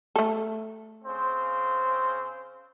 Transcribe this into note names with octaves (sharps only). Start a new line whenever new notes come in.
A3 A4
C#3 C4 C5